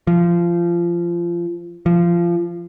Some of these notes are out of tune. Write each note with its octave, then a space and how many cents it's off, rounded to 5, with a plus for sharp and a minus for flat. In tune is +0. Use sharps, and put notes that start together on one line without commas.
F3 -20
F3 -20